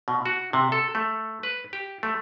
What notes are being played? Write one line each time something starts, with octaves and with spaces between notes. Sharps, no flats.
B2
F#4
C3
A4
A3
B4
G4
A3